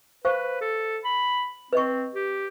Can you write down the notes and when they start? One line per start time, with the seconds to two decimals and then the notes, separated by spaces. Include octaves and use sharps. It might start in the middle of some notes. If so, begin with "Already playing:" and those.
0.25 B4 C5 F5 C#6
0.61 A4
1.05 B5
1.73 C4 B4 D#5 C#6
2.14 G4